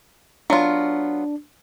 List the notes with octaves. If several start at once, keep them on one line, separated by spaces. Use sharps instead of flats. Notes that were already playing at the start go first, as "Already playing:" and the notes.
F#3 B3 D4 F4